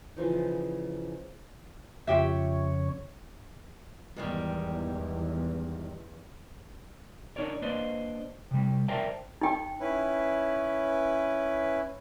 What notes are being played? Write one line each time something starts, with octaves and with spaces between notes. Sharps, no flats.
C#3 E3 F3 D#4
F2 C#3 F4 G4 C#5 E5
E2 G#2 D#3 G3
D4 D#4 A#4 C#5 D5
A#3 D4 B4 C5 D5 D#5
C3 G3
A#4 C5 D5 E5 G5 A5
D#4 G5
C#4 E4 B4